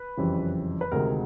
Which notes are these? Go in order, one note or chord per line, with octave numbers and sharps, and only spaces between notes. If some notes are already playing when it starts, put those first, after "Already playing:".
Already playing: B4
F#1 F2 C#3 E3 G3
B4
D2 C3 D#3 G#3 A#4